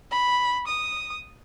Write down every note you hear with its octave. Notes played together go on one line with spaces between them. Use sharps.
B5
D#6